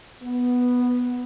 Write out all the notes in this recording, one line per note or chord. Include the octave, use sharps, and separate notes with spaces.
B3